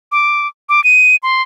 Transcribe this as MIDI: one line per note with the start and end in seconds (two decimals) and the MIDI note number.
0.12 0.47 86
0.69 0.83 86
0.84 1.16 99
1.23 1.42 84